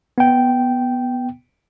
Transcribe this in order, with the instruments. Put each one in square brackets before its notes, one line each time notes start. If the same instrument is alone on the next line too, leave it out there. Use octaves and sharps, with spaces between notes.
[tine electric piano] B3 G5